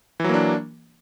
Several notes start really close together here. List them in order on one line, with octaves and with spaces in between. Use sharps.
E3 F#3 A#3 D4